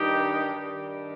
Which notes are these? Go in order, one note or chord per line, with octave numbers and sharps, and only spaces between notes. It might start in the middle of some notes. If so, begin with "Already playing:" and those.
Already playing: G2 D#3 G3 D#4 G4
G2 D#3 G3